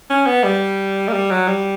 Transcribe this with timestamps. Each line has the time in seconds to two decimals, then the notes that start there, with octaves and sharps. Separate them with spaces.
0.10 C#4
0.26 B3
0.44 G3
1.08 A#3
1.13 G3
1.31 F#3
1.48 G3